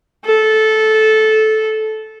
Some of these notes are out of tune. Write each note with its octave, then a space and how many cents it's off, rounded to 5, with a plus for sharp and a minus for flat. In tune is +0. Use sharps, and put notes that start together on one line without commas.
A4 -15